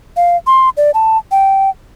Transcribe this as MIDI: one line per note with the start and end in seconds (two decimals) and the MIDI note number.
0.17 0.37 77
0.47 0.69 84
0.77 0.91 74
0.94 1.17 81
1.31 1.70 79